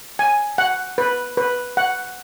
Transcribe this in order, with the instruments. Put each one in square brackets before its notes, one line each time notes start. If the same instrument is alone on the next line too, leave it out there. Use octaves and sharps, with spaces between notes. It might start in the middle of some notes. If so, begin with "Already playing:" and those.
[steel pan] G#5
F#5
B4
B4
F#5